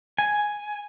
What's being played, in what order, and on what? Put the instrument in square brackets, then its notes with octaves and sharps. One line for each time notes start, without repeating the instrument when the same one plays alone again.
[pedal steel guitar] G#5